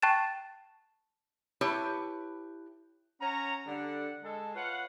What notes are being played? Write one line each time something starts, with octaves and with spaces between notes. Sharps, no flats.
G5 A5 C#6 F#6 A6 E7
E4 G4 B4 C#5 A5
C#4 C#5 F#5 A#5
D3 G3 F#5
G#3 A4
F4 B4 C#5 F5 F#5